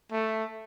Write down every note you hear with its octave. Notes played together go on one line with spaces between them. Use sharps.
A3